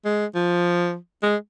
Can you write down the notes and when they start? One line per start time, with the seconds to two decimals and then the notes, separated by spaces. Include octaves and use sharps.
0.05 G#3
0.35 F3
1.22 G#3